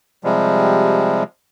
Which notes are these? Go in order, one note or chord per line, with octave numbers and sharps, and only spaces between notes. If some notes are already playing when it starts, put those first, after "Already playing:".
C3 F3 G3 G#3